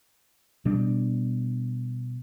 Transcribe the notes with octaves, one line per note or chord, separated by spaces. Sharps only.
B2 G3 D4